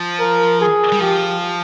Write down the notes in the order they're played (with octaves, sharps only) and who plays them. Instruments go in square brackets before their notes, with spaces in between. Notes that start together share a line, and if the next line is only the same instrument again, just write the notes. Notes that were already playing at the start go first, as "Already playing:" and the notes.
Already playing: [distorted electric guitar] F3
[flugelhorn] A#4
G#4
[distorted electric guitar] G3
[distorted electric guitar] F3 [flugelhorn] G4